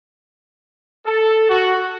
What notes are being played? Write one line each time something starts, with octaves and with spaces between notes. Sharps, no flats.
A4
F#4